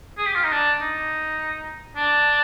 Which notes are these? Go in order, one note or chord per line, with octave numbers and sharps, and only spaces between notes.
G#4
G4
F4
D#4
D4
D#4
D4